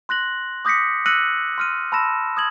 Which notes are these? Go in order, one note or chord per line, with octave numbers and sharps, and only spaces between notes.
C6 F#6 A#6 F#7
D6 D#6 G6 A#6 B6 C#7
E6 F#6 A#6 C#7 D#7 F#7
C6 F6 D#7
A5 B5 C6 E6 A#6 E7
D#6 G#6 F#7